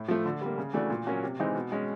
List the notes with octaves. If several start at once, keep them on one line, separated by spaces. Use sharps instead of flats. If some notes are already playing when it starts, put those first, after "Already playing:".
Already playing: A2
F3 A3
D3
G3 A#3
C#3
E3 A3 D4 F#4
A#2
F#3 A#3 C#4 F#4
C3
E3 G#3 C4 D#4
B2
G#3 C#4